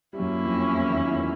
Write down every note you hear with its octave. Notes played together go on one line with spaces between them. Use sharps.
G3
F#2 F#3 A#3 C#4 E4
F2 F3
E2 E3
D#2 D#3
E2 E3